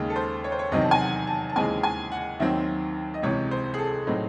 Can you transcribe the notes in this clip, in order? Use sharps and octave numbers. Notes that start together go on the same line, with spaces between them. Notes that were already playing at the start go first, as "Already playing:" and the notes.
Already playing: D#2 C#3 G#3
A4
C5
C#5
C5
C#5
E2 C3 D#3 F#3 C4 D#5
A5
G#5
F#5
A5
A5
D#2 C#3 E3 G#3 C4 G#5
G#5
F#5
D#2 D#3 F#3 C4 E5
D#5
C#2 C3 E3 G#3 C#5
C5
G#4
A4
A2 F#3 C4 D#4